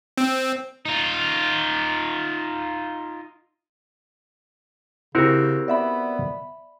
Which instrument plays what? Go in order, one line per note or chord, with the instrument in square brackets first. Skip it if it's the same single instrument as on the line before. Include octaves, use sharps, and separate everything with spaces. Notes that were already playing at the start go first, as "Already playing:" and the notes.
[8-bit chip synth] C4
[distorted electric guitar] D#4 F4
[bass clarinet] C#3 [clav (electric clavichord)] C4 F#4 A#4 [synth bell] E4 G4
[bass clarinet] B3 [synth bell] D5 E5 B5